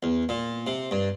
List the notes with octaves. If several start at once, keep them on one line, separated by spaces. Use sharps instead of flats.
E2
A#2
C3
G2